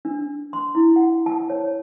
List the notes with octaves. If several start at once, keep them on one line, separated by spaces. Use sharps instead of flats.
D4
C6
E4
F#5
A5
C#5